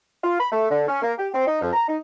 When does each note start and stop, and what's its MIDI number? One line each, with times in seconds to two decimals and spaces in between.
0.23 0.38 65
0.39 0.48 83
0.52 0.69 57
0.70 0.85 50
0.87 0.98 61
1.02 1.13 58
1.18 1.27 67
1.33 1.46 60
1.47 1.60 63
1.61 1.71 41
1.73 1.85 82
1.87 1.98 63